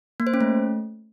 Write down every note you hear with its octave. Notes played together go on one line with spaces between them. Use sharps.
A#3
C5
C#4
A3